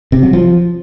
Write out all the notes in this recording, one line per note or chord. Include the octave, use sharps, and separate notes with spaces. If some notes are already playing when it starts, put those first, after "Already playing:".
C3
F#3
F3